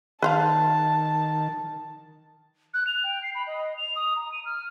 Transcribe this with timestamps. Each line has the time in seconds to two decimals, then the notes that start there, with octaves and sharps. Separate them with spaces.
0.22 D#3 B4 C5 F5 A5
2.74 F#6
2.87 F7
3.04 G5
3.23 C7
3.35 B5
3.47 D#5
3.77 F7
3.96 D#6
4.16 A#5
4.32 D#7
4.45 F6